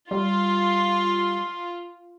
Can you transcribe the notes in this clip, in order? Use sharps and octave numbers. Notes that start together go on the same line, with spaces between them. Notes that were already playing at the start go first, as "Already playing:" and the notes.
G3 F4